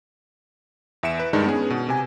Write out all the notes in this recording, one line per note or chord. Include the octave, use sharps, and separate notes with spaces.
E2 E5 C#7 D7 E7
B4
G2 D#3 G#3 D4 D#4
B3 C#4 G#4
B2
C3 G#5